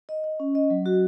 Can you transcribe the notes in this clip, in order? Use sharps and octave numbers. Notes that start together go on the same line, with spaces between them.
D#5
D#5
C#4
D#5
F#3
F#4